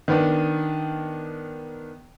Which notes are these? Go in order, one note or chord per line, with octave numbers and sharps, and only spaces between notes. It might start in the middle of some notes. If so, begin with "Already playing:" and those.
D#3 B3 D4